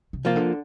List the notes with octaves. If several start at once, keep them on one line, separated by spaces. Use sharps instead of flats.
C3
F3 A#3 F4
D3